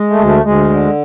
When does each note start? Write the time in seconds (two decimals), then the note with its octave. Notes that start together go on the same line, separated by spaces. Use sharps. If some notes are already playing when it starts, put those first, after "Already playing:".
Already playing: G#3
0.10 A3
0.19 D2
0.26 A3
0.44 D2 G#3
0.70 D3